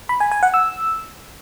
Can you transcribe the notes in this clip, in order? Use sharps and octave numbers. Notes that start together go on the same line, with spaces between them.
B5
G#5
G#5
F#5
E6